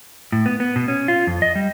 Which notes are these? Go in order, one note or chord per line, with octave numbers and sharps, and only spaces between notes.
A2
B3
B3
B2
C#4
F4
F2
D#5
G3